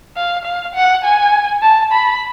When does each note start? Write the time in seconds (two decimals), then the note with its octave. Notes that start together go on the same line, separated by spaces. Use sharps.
0.16 F5
0.45 F5
0.75 F#5
1.05 G#5
1.62 A5
1.92 B5